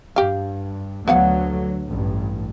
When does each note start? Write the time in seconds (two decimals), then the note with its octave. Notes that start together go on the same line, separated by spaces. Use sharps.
0.16 G2 G4 F5
1.08 D2 D3 F#3 B3 F5 F#5
1.90 A1 G2